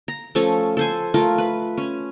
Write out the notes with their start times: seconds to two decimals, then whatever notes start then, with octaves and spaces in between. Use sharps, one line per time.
0.08 A#5
0.35 F3 A3 C#4 A4
0.77 A4 C5 G#5
1.14 A3 F4 A#4
1.38 B4
1.78 C#4